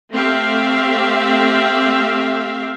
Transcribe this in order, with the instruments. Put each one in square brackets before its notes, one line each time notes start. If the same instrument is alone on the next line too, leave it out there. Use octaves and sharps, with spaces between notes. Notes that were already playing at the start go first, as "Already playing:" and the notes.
[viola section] A3 C4 G4 E5 F5